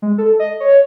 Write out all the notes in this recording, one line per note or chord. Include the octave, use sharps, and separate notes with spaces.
G#3
A4
D#5
C#5